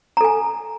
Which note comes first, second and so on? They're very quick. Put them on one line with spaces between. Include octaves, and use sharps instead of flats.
A#5 A4 G#5